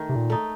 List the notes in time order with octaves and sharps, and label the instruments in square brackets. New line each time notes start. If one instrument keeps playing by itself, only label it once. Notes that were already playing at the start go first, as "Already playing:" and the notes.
Already playing: [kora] D#3 A3
[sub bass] C3
A#2
[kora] A3 D#4